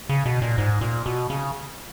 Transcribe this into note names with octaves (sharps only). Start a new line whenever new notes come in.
C#3
B2
A#2
G#2
A#2
B2
C#3